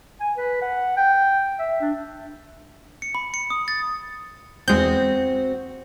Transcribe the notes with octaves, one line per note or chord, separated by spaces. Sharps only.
G#5
B4
F#5
G5
E5
D4
C#7
B5
C#7
D#6
A6
E2 G#3 C4 F#4 G6